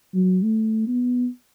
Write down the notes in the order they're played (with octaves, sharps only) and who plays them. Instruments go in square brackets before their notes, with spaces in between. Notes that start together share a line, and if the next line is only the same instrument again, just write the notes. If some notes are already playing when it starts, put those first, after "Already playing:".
[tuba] F#3
A3
B3